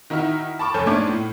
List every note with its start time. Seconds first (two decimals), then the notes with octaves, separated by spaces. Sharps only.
0.10 D#3 D#4 E4 F#4 F6
0.59 A5 B5 C#6 D6
0.74 F1 A4 C#5 G#5 F6 G6
0.86 G#2 A3 D4 C#5 D6 G#6
1.08 A2